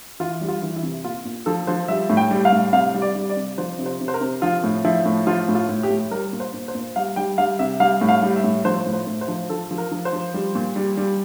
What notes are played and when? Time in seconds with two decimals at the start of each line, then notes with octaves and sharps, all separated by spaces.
0.20 E3 F4
0.41 G3
0.48 F4
0.62 E3
0.76 E4
0.83 C3
1.04 A#2 F4
1.25 A#2
1.46 F3 A4
1.67 F3 C5
1.88 G3 E5
2.10 A2
2.17 G5
2.31 G3
2.45 F5
2.52 A2
2.73 C3 F5
2.94 G3
3.02 D5
3.15 G3
3.29 D5
3.36 C3
3.58 F3 C5
3.79 C3
3.86 C5
4.00 C3
4.08 C5
4.14 A#4
4.21 C3
4.42 F3 F4
4.64 A2
4.85 F3 E4
5.06 A2
5.27 F3 F4
5.48 A2
5.55 F4
5.69 A2
5.83 G4
5.90 A2
6.11 G3 A#4
6.33 A#2
6.40 C5
6.54 A#2
6.68 C5
6.75 A#2
6.96 G3 F5
7.16 G3 G5
7.38 G3 F5
7.59 C3 E5
7.80 G3 F5
8.01 A2
8.08 F5
8.22 G3
8.36 E5
8.44 A2
8.65 F3 C5
8.86 A2
8.93 C5
9.07 A2
9.21 C5
9.28 F3
9.49 F3 A4
9.71 F3
9.78 A#4
9.91 F3
10.05 C5
10.13 F3
10.34 G3
10.55 A#2
10.76 G3
10.97 G3